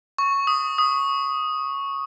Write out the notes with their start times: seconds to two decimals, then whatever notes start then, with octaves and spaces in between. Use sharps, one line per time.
0.18 C#6
0.47 D#6
0.78 D#6